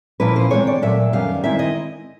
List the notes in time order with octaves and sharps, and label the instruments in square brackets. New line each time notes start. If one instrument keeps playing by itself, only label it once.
[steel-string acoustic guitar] A#2 F3 A#3 C#4 E4 B4
C5
D2 C3 E3 G#3 C4 C#5
D5
A#2 F#3 A3 E5
F#2 D#3 G3 B3 F5
D#3 G#3 C4 E4 E5
D#5